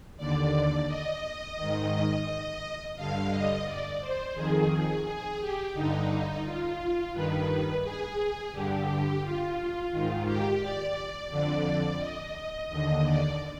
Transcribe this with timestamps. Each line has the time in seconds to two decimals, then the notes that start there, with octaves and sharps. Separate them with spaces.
0.18 D#2 D3 D5
0.87 D#5
1.57 G#2 D#3
2.96 G2 D3 F5
3.31 D#5
3.66 D5
4.01 C5
4.35 F2 D#3 G#4
5.05 G#4
5.40 G4
5.74 G2 D3 D#4
6.44 F4
7.13 G2 D#3 B4
7.83 G#4
8.52 G2 D3 G4
9.22 F4
9.91 G#2 D#3 F4
10.25 G4
10.60 D5
11.30 F2 D3 D5
11.99 D#5
12.69 D#2 D3 D#5
13.04 D5